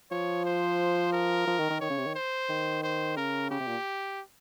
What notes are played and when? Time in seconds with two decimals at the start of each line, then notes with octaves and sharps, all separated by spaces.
0.11 F3 C#5
0.45 C5
1.13 A#4
1.47 F3
1.59 D#3
1.70 D#3
1.81 D#3 C#5
1.90 C#3
1.98 C3
2.06 D#3
2.15 C5
2.49 D#3
2.84 C5
3.17 C#3 A#4
3.50 C#3 G4
3.60 C3
3.67 A#2